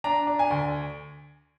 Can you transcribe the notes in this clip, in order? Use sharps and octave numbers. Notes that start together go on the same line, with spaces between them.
D4 A#5
D4
G#5
D2